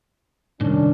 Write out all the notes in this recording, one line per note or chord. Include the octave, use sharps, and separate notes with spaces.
C2 G#2 D#3 C#4 D4